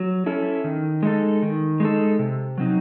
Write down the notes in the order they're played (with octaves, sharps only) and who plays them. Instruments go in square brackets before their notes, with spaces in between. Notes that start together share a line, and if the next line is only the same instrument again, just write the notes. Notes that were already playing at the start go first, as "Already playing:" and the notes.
Already playing: [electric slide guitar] F#3
C#4 E4 A4
D#3
G#3 D#4 A4
D#3
G#3 D#4 A4
C3
F#3 C4 D#4